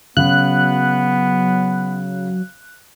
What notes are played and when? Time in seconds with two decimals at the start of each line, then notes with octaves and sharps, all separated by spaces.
0.17 C#3 F#3 B3 F#6